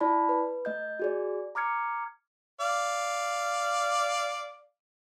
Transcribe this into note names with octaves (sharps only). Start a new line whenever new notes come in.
E4 D5 A5 B5
B4
A3 D#5 G6
F#4 G#4 D5
A#5 D6 F6 G#6 C#7
D5 F5